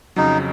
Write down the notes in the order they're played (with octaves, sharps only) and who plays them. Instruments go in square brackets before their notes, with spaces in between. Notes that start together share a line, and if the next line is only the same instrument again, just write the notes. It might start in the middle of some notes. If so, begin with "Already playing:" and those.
[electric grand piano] F2 C#3 F#3 [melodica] D#4